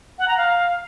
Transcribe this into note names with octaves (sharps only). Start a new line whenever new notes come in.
F#5
A#5
F5